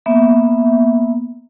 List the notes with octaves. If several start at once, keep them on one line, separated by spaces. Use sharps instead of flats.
A#3 B3 E5